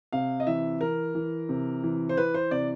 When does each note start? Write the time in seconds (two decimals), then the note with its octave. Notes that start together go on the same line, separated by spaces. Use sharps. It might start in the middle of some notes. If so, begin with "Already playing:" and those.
0.12 C3 F5
0.40 D#5
0.47 E3 E5
0.81 E3 A#4
1.15 E3
1.49 C3
1.83 E3
2.09 C5
2.17 E3 B4
2.34 C5
2.51 C3 D5